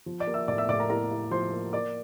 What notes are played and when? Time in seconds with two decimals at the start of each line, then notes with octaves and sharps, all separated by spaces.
0.06 F3
0.20 D5 D6
0.27 A#3
0.34 E5 E6
0.48 A2 D5 D6
0.58 E5 E6
0.69 A2 D5 D6
0.79 A#4 A#5
0.90 E4 A#4 A#5
1.11 E4
1.31 F3 C5 C6
1.52 A#3
1.73 A#3 D5 D6